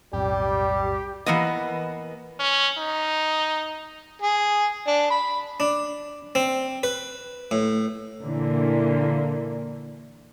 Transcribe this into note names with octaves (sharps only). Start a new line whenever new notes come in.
B1 F2 A2 G3 G4
E3 A#3 B3 D#5
C#4
D#4
G#4
D4
B5
D4
C4
B4
A2
A#2 D3 E3 A#3